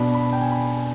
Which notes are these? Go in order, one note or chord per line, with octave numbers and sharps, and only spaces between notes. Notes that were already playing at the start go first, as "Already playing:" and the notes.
Already playing: B2 B3 D4 B5
B5
G5
G#5
B5